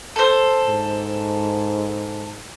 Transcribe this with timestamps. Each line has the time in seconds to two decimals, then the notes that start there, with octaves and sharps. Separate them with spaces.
0.16 A4 C5
0.67 G#2